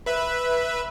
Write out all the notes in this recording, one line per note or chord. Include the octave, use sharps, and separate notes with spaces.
B4 E5